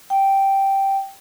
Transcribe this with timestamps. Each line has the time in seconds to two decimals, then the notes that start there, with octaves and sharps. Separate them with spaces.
0.10 G5